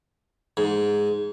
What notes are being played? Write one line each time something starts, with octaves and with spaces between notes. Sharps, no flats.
G#2